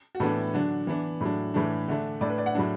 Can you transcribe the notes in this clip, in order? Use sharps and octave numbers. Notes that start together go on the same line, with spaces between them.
F#4
A2 E3 B3 D4 A4
D3 F#3 D4
E3 B3 D4
A2 F#3 D4
A2 E3 A3 D4
D3 A3 D4
A2 A3 D4 D5
B4
D5
F#5
A2 F#3 D4